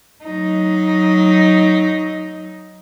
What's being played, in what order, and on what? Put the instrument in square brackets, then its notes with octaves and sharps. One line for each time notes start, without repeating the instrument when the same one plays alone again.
[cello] F#3 D#4